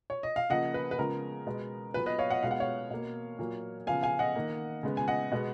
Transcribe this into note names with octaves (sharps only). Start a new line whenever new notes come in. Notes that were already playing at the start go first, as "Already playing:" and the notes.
C#5
D#5
F5
C#3 F3 A#3 D#5 F#5
B4
B4
C#3 F3 G#3 B3 A#4
B2 G#3 B3
A#2 F#3 B3 B4
B4 D#5
C#5 F5
D#5 F#5
B2 G#3 B3 F5
F#5
C#5 F5
B2 A#3
A#2 F#3 A#3
C#3 F3 B3 F5 G#5
F5 G#5
D#5 F#5
D#3 A#3
C#3 G#3 B3
G#5
D#5 F#5
B2 G#3 B3